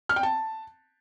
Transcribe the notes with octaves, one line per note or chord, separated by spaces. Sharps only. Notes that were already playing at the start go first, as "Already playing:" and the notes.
F6
G5
A5